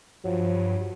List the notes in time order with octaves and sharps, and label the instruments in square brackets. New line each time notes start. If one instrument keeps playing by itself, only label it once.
[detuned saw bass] G2 [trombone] F3 [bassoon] F#3